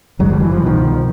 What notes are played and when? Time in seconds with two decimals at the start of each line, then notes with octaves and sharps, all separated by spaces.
0.19 F#1 F#2 D3 F#3 G#3
0.30 F3 G3
0.41 E3 F#3
0.51 F3
0.59 E3
0.62 C2 B2 D#3 F3